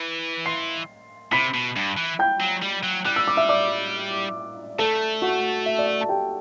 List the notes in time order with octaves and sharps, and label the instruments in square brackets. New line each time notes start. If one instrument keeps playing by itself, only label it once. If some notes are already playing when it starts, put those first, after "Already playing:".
Already playing: [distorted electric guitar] E3
[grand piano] C6 C7
[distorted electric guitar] C3 [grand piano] B5 B6
[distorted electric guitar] B2
G2
E3
[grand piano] G5 G6
[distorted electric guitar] F#3
G3
F#3
[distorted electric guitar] G3 [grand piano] F#6
[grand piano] E6
D6
E5 E6
D5 D6
[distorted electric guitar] A3 [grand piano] A4 A5
[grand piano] F#4 F#5
E5
D5
E5
A5
G4 G5